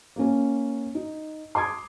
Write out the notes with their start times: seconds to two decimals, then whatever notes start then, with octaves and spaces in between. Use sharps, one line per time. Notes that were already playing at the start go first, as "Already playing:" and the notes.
0.16 A#3 C#4
0.95 D#4
1.55 C6 D6 D#6 G#6